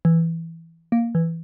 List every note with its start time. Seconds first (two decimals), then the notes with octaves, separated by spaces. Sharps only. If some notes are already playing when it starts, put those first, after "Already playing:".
0.05 E3
0.92 A#3
1.15 E3